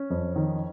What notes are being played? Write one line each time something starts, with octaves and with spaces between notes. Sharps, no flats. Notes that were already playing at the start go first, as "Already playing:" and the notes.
Already playing: C#4
F2
D#3